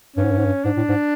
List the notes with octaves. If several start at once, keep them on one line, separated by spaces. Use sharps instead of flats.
G2 C#4
G#2
G2
G#2
G2
G#2 D4
A2
G#2